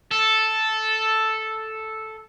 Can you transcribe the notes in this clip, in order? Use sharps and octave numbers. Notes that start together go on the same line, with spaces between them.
A4